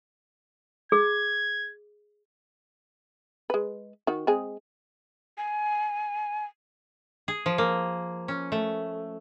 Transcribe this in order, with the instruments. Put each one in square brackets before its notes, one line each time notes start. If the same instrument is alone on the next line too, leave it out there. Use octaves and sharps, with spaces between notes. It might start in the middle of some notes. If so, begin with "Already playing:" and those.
[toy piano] G#4 [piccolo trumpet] G#6
[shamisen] G#3 B4
D#3 F#4
G#3 C4 G#4
[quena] G#5
[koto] G#4
F3
A#3
C#4
A3